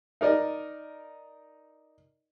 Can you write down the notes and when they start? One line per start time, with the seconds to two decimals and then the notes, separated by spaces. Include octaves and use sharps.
0.21 D#4 A#4 D5 D#5